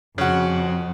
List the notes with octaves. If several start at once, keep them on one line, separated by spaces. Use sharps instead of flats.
F2 C#3 F#4